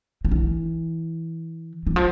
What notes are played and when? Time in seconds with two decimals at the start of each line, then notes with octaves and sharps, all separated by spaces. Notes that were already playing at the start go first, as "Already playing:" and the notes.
0.25 F3
0.31 E3
1.87 E3
1.96 F3